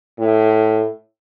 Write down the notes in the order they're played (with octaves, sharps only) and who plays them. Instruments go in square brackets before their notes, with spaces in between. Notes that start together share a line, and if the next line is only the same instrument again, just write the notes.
[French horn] A2